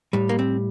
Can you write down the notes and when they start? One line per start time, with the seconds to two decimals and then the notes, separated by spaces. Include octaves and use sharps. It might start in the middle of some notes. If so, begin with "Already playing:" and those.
0.13 A2 G3
0.29 A#3
0.39 C4